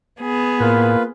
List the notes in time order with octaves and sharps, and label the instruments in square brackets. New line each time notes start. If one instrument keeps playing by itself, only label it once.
[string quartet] B3 G#4
[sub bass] A2 [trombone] A#3 [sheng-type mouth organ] F4 B4